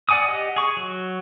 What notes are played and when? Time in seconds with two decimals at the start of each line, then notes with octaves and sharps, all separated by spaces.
0.09 D5 F#5 G#5 D6 D#6
0.28 G4 D#5 F#5
0.56 G#4 C#6
0.77 F#3